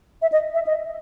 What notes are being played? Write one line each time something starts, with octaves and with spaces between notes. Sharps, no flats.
E5
D#5
E5
D#5